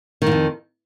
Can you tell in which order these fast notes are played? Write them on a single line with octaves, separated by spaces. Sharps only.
D#3 G#2 F2